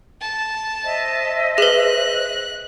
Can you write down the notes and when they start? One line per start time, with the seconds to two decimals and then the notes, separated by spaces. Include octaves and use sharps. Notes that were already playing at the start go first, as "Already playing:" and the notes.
0.21 A5
0.83 C5 D#5 E5
1.58 G#4 B4 F#6